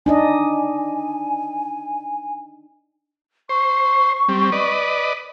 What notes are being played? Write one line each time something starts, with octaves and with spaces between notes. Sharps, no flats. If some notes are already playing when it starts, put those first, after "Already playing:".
D4 D#4 D#5 G#5
C5 C#6
G3 C4
B4 D5 D#5